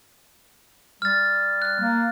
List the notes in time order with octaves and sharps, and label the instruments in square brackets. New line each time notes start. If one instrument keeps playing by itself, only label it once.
[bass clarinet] G3 [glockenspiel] F6 A6
[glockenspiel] F#6
[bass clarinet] A#3